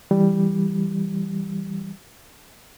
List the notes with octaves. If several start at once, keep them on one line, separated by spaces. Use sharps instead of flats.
E3 G3